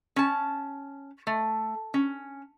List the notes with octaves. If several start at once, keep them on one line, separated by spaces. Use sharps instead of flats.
C#4 A5
A3
C#4